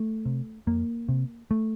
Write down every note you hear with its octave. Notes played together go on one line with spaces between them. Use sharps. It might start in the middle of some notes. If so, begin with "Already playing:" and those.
Already playing: A3
C3
F2 A#3
C3
A3